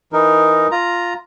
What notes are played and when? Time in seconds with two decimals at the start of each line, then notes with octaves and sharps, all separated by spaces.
0.13 E3 D#4 A#4
0.71 F4 A#5